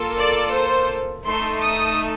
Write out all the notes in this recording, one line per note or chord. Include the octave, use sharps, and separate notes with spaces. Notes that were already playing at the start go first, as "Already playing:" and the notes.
Already playing: A#3 F4 A4
D5
C5
A3 D#4 A4 C6
D#6